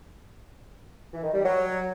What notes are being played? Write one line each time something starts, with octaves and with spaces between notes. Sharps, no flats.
E3
D#3
G3
F#3